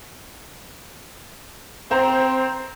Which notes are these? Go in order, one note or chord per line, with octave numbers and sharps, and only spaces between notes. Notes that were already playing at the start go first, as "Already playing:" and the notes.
C4 C5 A#5